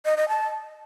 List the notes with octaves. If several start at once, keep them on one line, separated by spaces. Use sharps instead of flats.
D#5
D#5
A5